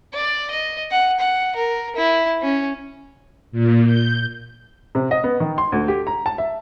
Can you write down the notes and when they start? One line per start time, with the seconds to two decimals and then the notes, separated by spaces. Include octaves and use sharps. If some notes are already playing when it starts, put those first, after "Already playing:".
0.13 D5
0.51 D#5
0.91 F#5
1.20 F#5
1.55 A#4
1.96 E4
2.42 C#4
3.52 A#2
3.86 G6
4.95 C3
5.11 D#5
5.24 B3
5.40 D#3
5.58 C6
5.72 D2
5.88 G4
6.07 A#5
6.26 A5
6.38 E5